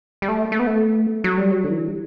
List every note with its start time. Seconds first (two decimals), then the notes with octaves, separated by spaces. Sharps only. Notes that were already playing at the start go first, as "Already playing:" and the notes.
0.22 G3
0.28 A3
0.52 A3
0.59 B3
0.67 A3
1.24 F#3
1.38 G3
1.51 F#3
1.64 D3
1.71 E3
1.88 G3